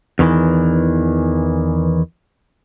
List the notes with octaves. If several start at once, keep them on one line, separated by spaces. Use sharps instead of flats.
E2 D#3 E3